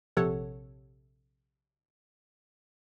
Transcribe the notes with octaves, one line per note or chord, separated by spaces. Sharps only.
A#1 C3 A4 C#5 F#5